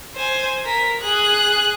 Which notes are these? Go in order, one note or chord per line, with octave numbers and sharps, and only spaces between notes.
C5 G#5
A#4 B6
G#4 F#6